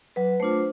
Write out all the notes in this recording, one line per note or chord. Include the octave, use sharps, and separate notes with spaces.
F#3 B4
A3 D4 F4 C5